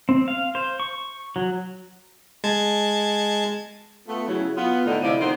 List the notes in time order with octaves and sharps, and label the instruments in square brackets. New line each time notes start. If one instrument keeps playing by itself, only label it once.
[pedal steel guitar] C4
F5
C5
C#6
F#3
[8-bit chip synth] G#3 A5 G#6
[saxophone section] A3 B3 F4
C#3 F#3 E4
B3 F4
A2 D3 D#4
A2 C3 F3 E4 D5 D#5
C3 D#3 B3 F4 C5